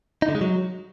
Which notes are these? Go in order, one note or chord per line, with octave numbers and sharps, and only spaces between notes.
D#4
D3
G#3
F#3